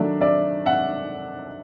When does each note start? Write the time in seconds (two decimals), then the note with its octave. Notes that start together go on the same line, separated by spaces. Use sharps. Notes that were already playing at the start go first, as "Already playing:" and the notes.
Already playing: D#3 F#3 A3 D4 D5 E5
0.21 D5 E5
0.66 E5 F#5